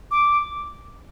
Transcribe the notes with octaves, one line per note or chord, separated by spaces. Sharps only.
D6